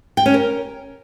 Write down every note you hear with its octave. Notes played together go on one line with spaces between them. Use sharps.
G5
C#4
A#4